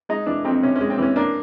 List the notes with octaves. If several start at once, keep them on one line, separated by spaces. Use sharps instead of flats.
G#3 D#4
E3 D4
F2 C4
C3 C#4
G#3 C#4
C4
E3 C#4
A#3 D4